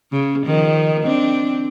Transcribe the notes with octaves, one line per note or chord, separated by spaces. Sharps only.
C#3
D#3 F3
C4 D4